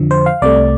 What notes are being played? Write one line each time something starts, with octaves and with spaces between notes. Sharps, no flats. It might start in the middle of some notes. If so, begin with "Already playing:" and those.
Already playing: F2 D3 F3
C5
F5
C2 C3 A3 D5